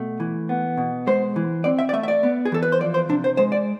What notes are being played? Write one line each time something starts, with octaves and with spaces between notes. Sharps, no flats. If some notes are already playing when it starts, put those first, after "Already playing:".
Already playing: B2 A3
E3
B3
B2
G#3 C5
E3
C4 D5
E5
D5
A3 E5
E5
D5
B3
G#4
E3 A4
B4
C5
F3 D5
C5
C3 D4
C5
G#3 C5
D5